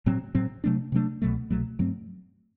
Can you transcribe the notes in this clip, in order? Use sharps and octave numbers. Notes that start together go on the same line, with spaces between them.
A2 F#3 C4
A2 F#3 C4
C3 F#3 A3 D4
C3 F#3 A3 D4
C2 B2 F#3 A3
C2 B2 F#3 A3
G2 F#3 A3 C4